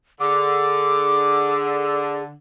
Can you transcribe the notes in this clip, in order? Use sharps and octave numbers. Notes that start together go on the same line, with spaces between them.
D3 G#4 D6